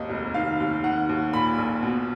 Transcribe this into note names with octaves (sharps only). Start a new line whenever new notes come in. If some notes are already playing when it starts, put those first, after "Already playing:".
Already playing: G#1 D#2 D#5
F1
D#3 F5
D#2
D#3 F#5
D#2
A#2 B5
A#1
B2